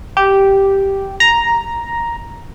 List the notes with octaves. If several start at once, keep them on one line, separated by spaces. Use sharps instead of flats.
G4
A#5